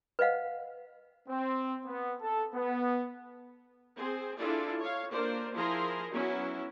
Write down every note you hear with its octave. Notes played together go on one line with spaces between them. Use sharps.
B4 C5 D#5 F5 F#5
C4
B3
A4
B3
C4 G#4 C5
D4 E4 F4 G#4 A4 D5
C#5 F5
A#3 D4 F4 A#4 C5 D5
F3 E4 G#4 A#4 A#5 C6
F#3 B3 C#4 E4 F#4